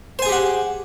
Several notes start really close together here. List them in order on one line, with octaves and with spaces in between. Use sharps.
C5 G#5 G#4 G4 F#5